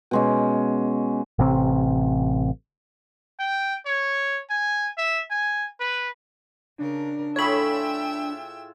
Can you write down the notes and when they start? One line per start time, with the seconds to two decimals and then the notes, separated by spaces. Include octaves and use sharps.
0.11 B2 G#3 C#4
1.39 A1 C3 C4
3.40 G5
3.86 C#5
4.50 G#5
4.97 E5
5.30 G#5
5.80 B4
6.78 C#3 D4 A#4
7.36 A2 F4 G#4 C#5 E5 G5 B5 E6